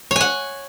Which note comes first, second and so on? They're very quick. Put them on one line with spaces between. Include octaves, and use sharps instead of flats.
C#5 G#5 F#5